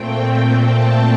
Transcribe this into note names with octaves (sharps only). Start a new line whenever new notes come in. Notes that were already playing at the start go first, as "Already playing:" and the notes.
Already playing: A#2 A3 C4 G5
G5
A5